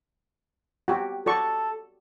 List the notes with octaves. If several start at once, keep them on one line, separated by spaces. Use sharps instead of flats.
F#4 G4
F#4 A4 D5 C#6